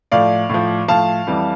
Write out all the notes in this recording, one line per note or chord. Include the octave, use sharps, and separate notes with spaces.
A2 F3 D5 F5
A2 F3
A2 F3 F5 A5
F2 E3 G3